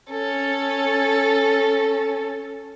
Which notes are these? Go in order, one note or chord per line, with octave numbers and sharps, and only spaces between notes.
C#4 A4